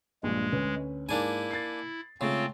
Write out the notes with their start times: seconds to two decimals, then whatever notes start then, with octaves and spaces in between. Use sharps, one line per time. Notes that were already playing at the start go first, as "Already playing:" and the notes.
0.23 A#1 G2 A#2 G#3
0.52 D2 C#4 B4
1.09 G#2 A#3 D4 E4 G#5
1.51 A6 C7
2.21 C#3 G#3 A3 C4 F4